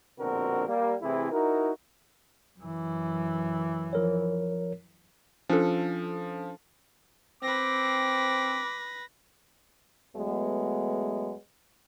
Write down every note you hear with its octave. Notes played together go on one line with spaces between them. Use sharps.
A#1 B2 D3 C4 F#4 A#4
G3 A#3
C3 E3 A3 C4 E4 G#4
D#4 E4 F#4 A#4
F#2 E3
F3 A#4 C#5
F3 C#4 D4 A4
C4 B4 D6 A#6
E2 F#3 G#3 A3 B3